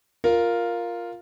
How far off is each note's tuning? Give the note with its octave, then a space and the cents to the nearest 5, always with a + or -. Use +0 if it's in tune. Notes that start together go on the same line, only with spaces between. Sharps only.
F4 +0 A#4 +0 F5 +0